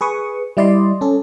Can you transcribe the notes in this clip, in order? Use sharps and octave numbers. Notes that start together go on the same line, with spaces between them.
G#4 B4 C#6 D#6
G3 E4 D5 D#5 C6
C#4 A4